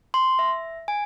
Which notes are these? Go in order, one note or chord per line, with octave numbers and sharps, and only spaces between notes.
C6
E5
G#5